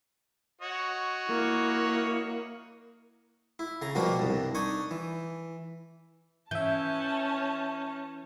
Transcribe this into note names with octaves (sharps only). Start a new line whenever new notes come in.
F#4 C#5 D#5
A#3 E4
E4
C#3 A#5
B2 F3 G3 A#3 F#4
C2 G2
D4 D#4 G#5 C#6
E3
E3 C#4 E5 A5 G6